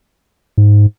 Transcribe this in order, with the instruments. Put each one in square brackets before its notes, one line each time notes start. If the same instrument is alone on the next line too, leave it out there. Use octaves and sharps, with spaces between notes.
[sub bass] G#2